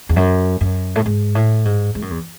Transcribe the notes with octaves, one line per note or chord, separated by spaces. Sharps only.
E2
F#2
F#2
A2
G#2
A2
G#2
G#2
F#2
E2